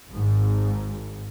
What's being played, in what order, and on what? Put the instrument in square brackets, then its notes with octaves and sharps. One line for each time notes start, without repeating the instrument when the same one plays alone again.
[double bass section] G#1 G#2